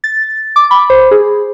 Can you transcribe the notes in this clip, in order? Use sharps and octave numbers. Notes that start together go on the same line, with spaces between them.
A6
D6
B5
C5
G#4